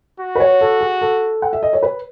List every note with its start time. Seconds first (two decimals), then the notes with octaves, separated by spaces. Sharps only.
0.20 F#4
0.35 B4
0.40 C#5
0.61 A4
0.81 G#4
1.01 A4
1.42 F#5
1.53 E5
1.63 D#5
1.73 C#5
1.83 B4